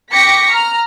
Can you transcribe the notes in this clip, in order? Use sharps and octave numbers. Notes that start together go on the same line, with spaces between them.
G5 C#6 D6 A#6 B6 C#7
A#5 F6